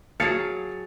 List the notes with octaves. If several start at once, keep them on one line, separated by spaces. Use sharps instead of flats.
F#3 G#4 F5 A5 A6 C#7